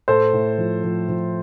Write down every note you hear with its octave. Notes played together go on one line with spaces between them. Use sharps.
A2 A4 C5
A2
F3
F3
F3